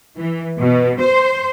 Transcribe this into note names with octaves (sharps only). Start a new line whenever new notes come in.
E3
B2
C5